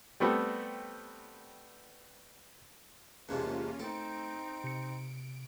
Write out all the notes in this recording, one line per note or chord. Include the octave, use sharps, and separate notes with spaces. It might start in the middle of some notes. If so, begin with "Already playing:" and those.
G3 A3 B3 C4 G4 A4
E2 G#2 C3 A#3 C#4 F4 A5
A3 C4 D#4 A4 D7
C3 C#7